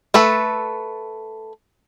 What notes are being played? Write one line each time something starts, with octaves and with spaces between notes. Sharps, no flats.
A3 A4 B4